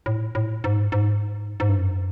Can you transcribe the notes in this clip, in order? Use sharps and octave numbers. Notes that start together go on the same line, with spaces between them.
A2
A2
G#2
G#2
G#2
G2
F#2